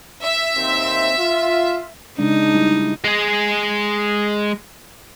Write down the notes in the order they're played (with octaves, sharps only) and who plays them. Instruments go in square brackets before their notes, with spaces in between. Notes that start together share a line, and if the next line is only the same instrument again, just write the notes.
[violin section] E5
[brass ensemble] D#2 C4
F4
[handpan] C#3 G#3 D4 [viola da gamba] D#4
[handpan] G3 A3 E4
[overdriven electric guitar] G#3 G#4